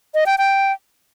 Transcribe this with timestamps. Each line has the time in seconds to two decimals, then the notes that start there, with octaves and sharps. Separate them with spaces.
0.14 D#5
0.26 G5
0.38 G5